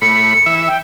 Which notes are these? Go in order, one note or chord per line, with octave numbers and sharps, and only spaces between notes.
A2 B5 C#7
E3 E5
G5